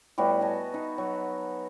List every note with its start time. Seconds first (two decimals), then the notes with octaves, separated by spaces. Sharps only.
0.18 A2 G3 B3 F#4
0.41 D#5 G#5 A5
0.74 D#4 B4
0.98 F#3